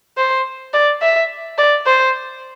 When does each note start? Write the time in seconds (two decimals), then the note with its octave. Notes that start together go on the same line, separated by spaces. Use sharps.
0.17 C5
0.74 D5
1.02 E5
1.58 D5
1.86 C5